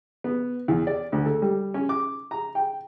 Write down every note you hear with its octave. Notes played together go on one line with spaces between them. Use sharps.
B3
E2
D5
D2
A4
G3
C#4
D6
A#5
G5